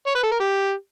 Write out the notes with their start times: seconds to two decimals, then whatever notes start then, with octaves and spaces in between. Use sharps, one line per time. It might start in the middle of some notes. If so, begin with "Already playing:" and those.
0.07 C#5
0.15 B4
0.23 A4
0.32 A#4
0.40 G4